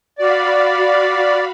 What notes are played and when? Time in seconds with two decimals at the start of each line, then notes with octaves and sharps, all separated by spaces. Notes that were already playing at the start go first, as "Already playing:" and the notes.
0.18 F#4 D5 F5 B5